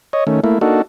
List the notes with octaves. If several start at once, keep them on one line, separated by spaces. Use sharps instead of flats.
C#5 D#5
D#3 A3 C#4
A3 A#3 E4
A#3 D4 D#4 F#4 A4